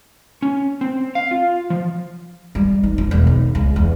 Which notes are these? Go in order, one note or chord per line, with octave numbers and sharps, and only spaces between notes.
C#4
C4
F5
F4
F3
G3
D#4
F3
E1
D#3
C#2
E2